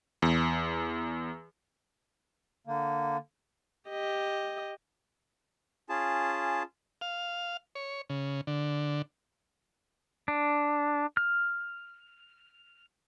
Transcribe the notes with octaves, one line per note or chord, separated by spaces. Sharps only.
E2
D3 A#3
G4 D#5
C#4 F4 G#4 A5
F5
C#5
C#3
D3
D4
F6